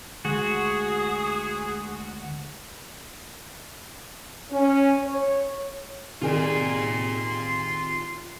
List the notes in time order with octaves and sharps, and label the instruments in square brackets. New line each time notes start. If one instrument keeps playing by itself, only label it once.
[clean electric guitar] D2 G#3 [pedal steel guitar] F#4 [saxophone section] G#4
[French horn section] C#4
C#5
[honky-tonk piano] C3 D#3 G#4 [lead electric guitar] F4 D5 [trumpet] C6